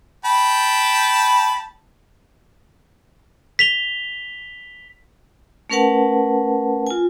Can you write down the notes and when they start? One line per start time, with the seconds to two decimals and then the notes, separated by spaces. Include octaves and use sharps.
0.25 G5 A5 B5
3.59 B6 F7 G7
5.70 A3 C#4 A#4 B4 F#5 A5
6.87 F4 G#5